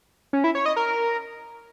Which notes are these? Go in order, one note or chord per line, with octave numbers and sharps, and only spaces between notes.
C#4
E4
C#5
D#5
A#4